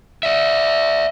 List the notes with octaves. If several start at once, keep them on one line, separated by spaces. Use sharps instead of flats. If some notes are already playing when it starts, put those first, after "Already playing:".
D5 E5